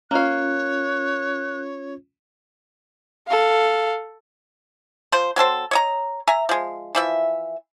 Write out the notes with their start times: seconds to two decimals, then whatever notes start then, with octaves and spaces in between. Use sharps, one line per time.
0.11 A#3 C#4 F4 C#5 F5 F#6
3.28 A4 F5
5.12 F3 C5
5.36 F#3 C4 A4 C5
5.71 C#5 D#5 A#5
6.28 E5 G#5 A#5
6.49 F3 G#3
6.95 E3 F3 E5